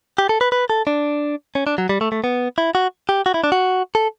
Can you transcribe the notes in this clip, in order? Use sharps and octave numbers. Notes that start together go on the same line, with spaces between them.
G4
A4
B4
B4
A4
D4
C#4
D4
F#3
G3
A3
A3
B3
E4
F#4
G4
F#4
E4
D4
F#4
A4